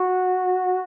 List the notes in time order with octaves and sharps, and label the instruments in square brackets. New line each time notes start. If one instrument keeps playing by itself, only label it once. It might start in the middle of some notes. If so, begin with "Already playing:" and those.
Already playing: [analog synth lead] F#4